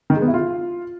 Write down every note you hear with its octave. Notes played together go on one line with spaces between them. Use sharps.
D#3
G#3
B3
E4
F4